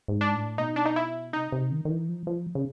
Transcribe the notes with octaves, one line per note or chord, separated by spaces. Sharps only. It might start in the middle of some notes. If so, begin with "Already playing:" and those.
G#2
D4
A2
B2 D#4
D4
D#4
E4
C3 D#4
C3
D#3
D#3
E3
F3
F3
C#3